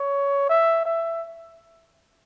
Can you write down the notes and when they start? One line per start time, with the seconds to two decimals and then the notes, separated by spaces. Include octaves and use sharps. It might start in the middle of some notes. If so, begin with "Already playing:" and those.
Already playing: C#5
0.49 E5
0.86 E5